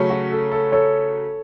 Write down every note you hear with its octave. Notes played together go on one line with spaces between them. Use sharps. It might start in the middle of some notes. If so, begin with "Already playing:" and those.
Already playing: C#3 F#3 A3 C#4
F#4
A4
A4
A4 C#5